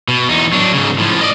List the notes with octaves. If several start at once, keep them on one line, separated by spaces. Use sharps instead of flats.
B2
E2 D#4
F#3 D4
G#2 C#3
A2 F3
D5 D#5